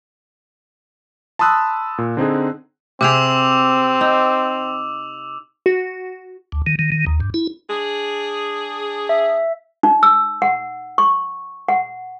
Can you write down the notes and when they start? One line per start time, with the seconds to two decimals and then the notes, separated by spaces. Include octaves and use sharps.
1.39 A5 B5 C6 D#6 E6 F#6
1.98 A#2
2.17 D3 C4 D#4 G#4
3.01 C3 C4 G4 G#4 D6 E6 F7
4.01 D#4
5.66 F#4
6.52 D2
6.67 D#3
6.79 D#3
6.92 D#3
7.06 D#2
7.20 G2
7.34 E4
7.68 D4 G#4
9.09 E5
9.83 D#4
10.03 E6
10.42 F#5
10.98 C#6
11.68 F#5